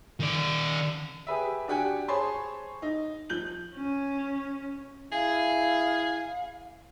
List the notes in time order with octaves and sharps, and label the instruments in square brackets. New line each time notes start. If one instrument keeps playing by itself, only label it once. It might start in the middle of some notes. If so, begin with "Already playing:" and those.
[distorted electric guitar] D#3 D5
[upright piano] G4 G#4 B4 E5
D4 F#4 G4 F#5 G#5
G#4 C5 C#5 A5 B5 C6
D#4
F3 G6 F#7
[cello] C#4
[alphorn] E4 [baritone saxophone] G#4 [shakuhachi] F5